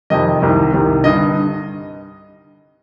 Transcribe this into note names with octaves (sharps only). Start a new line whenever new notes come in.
F2 C3 D#3 D#5
C2 C3 D#3
C2 C3 D#3
G2 D3 D#5